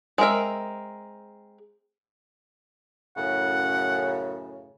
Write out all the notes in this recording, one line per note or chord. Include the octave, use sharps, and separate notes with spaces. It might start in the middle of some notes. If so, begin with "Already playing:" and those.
G#3 C4 A#4 E5
F#2 A2 C#3 F#5